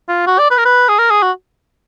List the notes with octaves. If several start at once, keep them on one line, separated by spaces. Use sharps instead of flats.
F4
F#4
D5
B4
A#4
B4
G#4
A#4
G#4
F#4